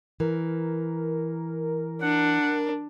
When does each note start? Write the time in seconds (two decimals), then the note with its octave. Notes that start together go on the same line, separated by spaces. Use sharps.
0.20 E3 A#4
2.02 D4 F#5